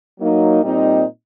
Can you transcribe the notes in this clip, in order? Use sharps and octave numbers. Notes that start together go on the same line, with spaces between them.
F#3 A#3 D#4
A#2 G3 C4 D#4